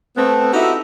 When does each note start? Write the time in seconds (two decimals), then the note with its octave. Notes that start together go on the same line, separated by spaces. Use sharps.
0.17 A3 B3 C4
0.53 D#4 E4 F#4 G4 A4 E5